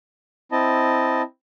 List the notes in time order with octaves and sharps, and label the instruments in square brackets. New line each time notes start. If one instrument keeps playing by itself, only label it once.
[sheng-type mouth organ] C4 E4 D#5 A5